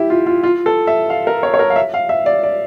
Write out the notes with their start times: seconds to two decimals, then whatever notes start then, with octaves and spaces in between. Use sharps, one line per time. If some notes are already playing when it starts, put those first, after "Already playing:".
Already playing: E4 G4
0.10 F4
0.26 F4
0.43 F4
0.66 A4
0.87 E5
1.10 F5
1.27 A#4
1.43 C#5
1.54 C#5
1.59 A#4
1.70 F5
1.76 E5
1.94 F5
2.09 E5
2.26 D5
2.43 D5